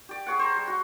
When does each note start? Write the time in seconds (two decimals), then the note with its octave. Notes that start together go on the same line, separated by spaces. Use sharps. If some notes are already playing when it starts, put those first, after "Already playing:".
0.09 G4 D5
0.27 G#4 C#5 F#5
0.39 C5 A#5
0.56 G3
0.68 F#4